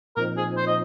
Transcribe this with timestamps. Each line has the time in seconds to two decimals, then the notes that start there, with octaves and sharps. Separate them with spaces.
0.17 A#2 F3 C4 D#4 A#4
0.37 G#4
0.57 C5
0.67 D#5